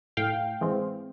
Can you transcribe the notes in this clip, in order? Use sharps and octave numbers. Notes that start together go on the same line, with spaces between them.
A2 F5 G5
E3 G#3 C4